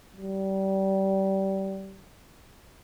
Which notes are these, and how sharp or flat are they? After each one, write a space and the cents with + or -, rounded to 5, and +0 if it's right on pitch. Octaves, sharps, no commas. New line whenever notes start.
G3 -25